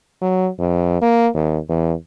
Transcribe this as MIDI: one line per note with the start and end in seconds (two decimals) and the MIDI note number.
0.22 0.49 54
0.59 0.98 41
1.02 1.28 58
1.35 1.58 39
1.69 1.93 40